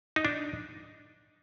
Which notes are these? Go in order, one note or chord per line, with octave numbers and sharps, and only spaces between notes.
D#4
D4